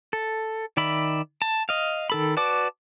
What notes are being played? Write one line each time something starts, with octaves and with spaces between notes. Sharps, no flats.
A4
D#3 D5 E5 B5
A5
D#5 F5
D#3 A4 B5
F#4 B4 D5 A5 D6